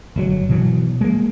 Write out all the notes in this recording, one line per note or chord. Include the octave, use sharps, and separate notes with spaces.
G1 C3 F#3
B2 E3 F#3
G#3 A#3